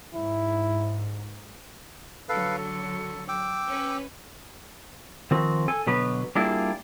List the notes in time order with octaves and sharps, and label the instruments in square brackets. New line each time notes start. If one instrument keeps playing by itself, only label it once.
[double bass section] G#2 [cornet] E4
[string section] D3 F#3 [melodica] A4 B4 F5
[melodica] A4
G5 D6 E6
[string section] C#4 B4
[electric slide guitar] D#3 F3 C4 F#4
A4 G#5
B2 D3 F#3 B3 B4
G3 A#3 D4 E4 F4 G#4